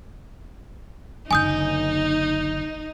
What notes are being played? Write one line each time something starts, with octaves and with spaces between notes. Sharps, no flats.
F#1 D3 D#4 G#5 D#6 G6